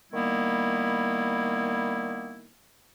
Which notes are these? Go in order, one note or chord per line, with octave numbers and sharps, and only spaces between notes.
D#3 G3 A#3 B3 E4